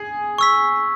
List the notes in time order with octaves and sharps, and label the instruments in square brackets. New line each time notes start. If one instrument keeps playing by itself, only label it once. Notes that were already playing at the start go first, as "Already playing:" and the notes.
Already playing: [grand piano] G#4 G#5
[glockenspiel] C#6 E6 B6